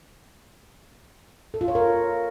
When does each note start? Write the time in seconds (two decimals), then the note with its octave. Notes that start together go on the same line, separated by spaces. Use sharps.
1.54 A4
1.61 F4
1.68 C#5
1.75 A#4